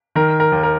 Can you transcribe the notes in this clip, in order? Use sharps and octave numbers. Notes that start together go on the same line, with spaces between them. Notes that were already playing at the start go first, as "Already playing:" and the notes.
D#3 A#4
A#4
D#2
A#4